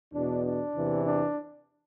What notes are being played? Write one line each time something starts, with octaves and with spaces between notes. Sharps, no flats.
E2 B2 D4
D4
E2 C3 E3
D4